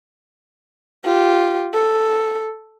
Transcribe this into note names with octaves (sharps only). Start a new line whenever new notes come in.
F4 G4
A4